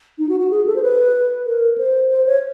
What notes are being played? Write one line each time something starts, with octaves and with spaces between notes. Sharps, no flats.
D#4
F#4
F#4
G#4
A4
C5
B4
A#4
C5
C5
C#5